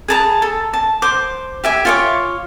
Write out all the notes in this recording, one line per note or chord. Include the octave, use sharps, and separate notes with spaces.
G#4 A5 A#5
A4
A5
C5 D6
G4 E5 G#5
F4 C#5 D6